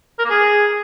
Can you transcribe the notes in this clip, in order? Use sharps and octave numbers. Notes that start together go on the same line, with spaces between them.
A#4
A#3
G#4